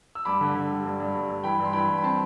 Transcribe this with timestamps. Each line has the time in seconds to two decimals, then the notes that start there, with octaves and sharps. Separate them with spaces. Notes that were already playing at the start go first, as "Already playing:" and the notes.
0.15 E6
0.25 G2 B5 D6
0.41 D3
0.55 D3
0.70 G3
0.85 G2
1.00 G2
1.15 G2
1.30 G2
1.44 E3 G5 B5
1.60 G2 C6
1.73 E3 G5 B5
1.89 G2
1.98 B5
2.03 C4 A5 C6